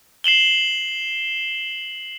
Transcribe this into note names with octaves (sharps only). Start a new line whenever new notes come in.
C7 E7 F#7 G7